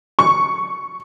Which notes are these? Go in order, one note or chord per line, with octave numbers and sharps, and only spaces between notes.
C#6